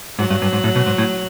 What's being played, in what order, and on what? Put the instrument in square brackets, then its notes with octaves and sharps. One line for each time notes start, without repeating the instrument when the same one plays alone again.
[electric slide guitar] G#2 [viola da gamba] F#3
[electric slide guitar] G2
G2
G#2
A2
B2
G#2
A2